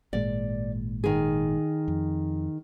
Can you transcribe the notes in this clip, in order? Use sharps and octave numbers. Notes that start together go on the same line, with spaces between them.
G#1 A#2 G#3 D5
D#3 G#4
F2